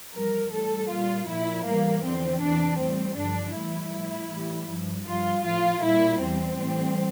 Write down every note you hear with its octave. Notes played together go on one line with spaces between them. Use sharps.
F2 E3 G3 A#4
A2 G3 A4
A#2 G3 F4
A#2 F3 E4
A2 E3 G3 A#3
E2 D3 F3 C4
E2 C3 E3 D4
A2 G3 C4
G2 D3 F3 D4
A2 E3 G3 E4
A2 F3
A2 E3 G3
G2 F3
G2 F3 F4
A2 F3 F4
A#2 G3 E4
E2 E3 G3 C4
A2 E3 G3